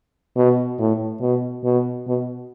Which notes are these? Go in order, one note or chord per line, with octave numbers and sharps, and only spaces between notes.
B2
A2
B2
B2
B2